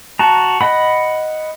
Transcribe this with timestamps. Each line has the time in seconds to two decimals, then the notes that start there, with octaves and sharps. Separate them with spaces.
0.19 F#4 A5 A#5
0.61 D#5 F#5 B5